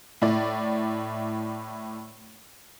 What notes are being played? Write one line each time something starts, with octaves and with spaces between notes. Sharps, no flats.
A2 E4 D5